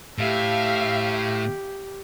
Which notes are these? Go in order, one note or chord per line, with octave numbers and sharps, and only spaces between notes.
A2 G4 E5 F5